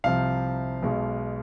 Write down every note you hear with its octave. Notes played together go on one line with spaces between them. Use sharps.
C2 C3 F3 F5
B1 B2 G#3